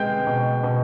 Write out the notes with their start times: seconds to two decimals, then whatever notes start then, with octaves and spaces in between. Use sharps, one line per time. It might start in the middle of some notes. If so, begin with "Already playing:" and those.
Already playing: G#3 B3 G5 G6
0.27 B2
0.64 B2